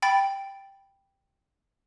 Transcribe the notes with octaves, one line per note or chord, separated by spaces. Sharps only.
G5 B5 A6 D7